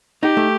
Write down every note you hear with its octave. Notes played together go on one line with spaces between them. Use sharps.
D#4 G4
A3